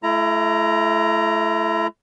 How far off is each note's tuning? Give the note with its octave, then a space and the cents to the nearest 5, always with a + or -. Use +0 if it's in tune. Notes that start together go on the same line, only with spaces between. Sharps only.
A3 -25 E4 +35 A#5 +0